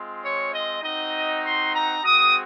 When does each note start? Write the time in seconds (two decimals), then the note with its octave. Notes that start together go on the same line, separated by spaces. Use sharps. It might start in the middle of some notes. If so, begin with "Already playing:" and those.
Already playing: G#3 C4 F4
0.21 C#5
0.52 D#5
0.82 C4 D#4 F#4 D#5
1.44 C6
1.74 A#5
2.04 G#3 C4 F#4 D#6